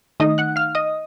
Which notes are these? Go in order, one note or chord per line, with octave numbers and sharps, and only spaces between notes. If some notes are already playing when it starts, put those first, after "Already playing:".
D#3 A3 D#4 D#5 D#6
F#5 F#6
F5 F6
D#5 D#6